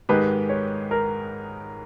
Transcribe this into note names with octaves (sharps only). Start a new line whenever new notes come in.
G#2 D#3 G#3 D#4 G4 B4
C#5
A#4